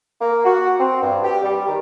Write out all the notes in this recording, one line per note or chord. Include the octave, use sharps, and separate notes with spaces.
A#3
F#4
C4
G2
G4
G3
D#3